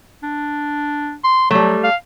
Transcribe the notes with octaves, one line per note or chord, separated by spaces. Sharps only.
D4
C6
F#3 G3 A3
F5